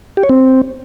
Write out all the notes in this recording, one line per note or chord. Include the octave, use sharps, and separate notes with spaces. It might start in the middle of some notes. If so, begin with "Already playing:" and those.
G4
C#5
C4